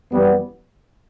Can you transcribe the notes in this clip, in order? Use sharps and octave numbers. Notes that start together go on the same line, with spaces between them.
F#2 E3 G3 B3